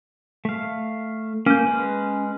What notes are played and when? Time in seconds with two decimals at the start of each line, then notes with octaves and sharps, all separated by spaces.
0.45 A3 F5
1.46 A#3 C#4 G6
1.67 G#3 B4